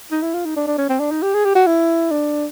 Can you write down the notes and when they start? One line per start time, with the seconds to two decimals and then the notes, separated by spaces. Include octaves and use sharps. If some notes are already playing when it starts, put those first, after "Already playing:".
0.12 D#4
0.22 E4
0.34 F4
0.45 D#4
0.56 D4
0.67 D4
0.78 C#4
0.89 C4
1.00 D4
1.11 D#4
1.22 G4
1.34 G#4
1.45 G4
1.55 F#4
1.67 E4
2.11 D4